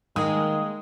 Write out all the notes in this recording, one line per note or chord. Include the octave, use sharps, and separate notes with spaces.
D#3 G#3 A#3 G#4 D#6